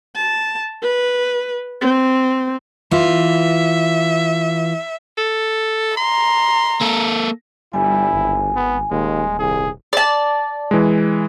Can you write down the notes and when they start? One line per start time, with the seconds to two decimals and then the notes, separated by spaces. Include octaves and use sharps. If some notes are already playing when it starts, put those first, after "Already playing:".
0.16 A5
0.83 B4
1.81 C4
2.91 E3 F4 E5
5.17 A4
5.97 A#5 C6
6.81 A#3 A4
7.73 G1 G3 E4 G#5
8.13 G#1
8.56 B3
8.91 D#1 D#2 G#3
9.39 C2 G#4
9.93 D5 A5
10.71 E3 G#3